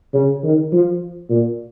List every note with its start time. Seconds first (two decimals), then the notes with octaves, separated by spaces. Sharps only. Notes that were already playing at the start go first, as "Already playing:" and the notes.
0.14 C#3
0.43 D#3
0.72 F3
1.30 A#2